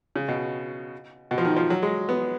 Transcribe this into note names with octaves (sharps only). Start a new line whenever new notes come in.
C#3
B2
B2
F3
D#3
F3
F#3
G#3
B3